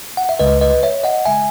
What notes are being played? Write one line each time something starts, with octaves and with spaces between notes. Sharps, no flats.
F#5
E5
C#2 C#3 G#3 B4 D#5
B4 D#5
C#5 E5
D#5 F#5
C#3 G#3 E5 G#5